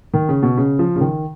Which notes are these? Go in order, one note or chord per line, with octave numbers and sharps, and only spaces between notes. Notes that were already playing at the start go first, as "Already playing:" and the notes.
D#3
C#3
B2
C#3
F3
C#3
D#3